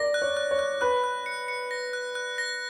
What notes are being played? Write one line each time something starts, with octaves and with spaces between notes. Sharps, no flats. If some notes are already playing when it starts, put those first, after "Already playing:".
Already playing: A#4 D5 A#6
F#6
C#5
F#6
C#5
F#6
B4 F#6
F#6
C#7
C#7
A#6
F#6
F#6
A#6